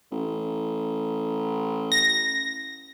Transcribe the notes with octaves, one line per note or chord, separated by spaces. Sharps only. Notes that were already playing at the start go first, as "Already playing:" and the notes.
A1
A#6